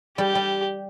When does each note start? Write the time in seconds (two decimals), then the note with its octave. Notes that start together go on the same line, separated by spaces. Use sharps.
0.18 G3 G4
0.35 G3